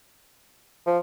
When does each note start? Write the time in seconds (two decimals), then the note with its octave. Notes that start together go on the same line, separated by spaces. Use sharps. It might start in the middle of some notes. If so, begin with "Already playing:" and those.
0.87 F3